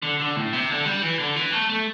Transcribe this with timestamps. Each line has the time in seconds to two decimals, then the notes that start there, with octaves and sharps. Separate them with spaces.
0.02 D3
0.19 D3
0.36 A2
0.53 C3
0.70 D3
0.85 G3
1.02 E3
1.19 D3
1.36 E3
1.52 A3
1.70 A3